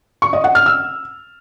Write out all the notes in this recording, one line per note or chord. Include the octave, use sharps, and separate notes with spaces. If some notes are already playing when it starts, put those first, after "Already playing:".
C#6
D#5
F#5
F6
E6